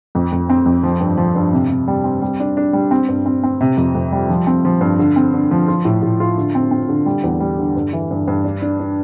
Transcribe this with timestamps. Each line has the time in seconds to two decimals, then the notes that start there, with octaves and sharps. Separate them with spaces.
0.15 F2
0.32 F2
0.50 C4
0.66 F2
0.83 F3
1.00 G2
1.18 F3
1.36 G2
1.53 C3
1.70 C3
1.88 G3
2.04 C4
2.22 G3
2.40 D4
2.57 D4
2.73 G3
2.91 C4
3.09 G2
3.26 C4
3.44 C4
3.61 C3
3.77 F2
3.95 F2
4.12 G3
4.29 F3
4.47 C4
4.65 F3
4.81 G2
4.99 D3
5.16 C4
5.34 D3
5.51 F3
5.68 F4
5.85 A2
6.02 A2
6.20 F4
6.38 D3
6.55 C4
6.71 C4
6.89 D3
7.06 G3
7.24 E2
7.40 G3
7.59 D3
7.76 G2
7.93 E3
8.11 G2
8.27 G2
8.44 D4
8.62 D4
8.80 D4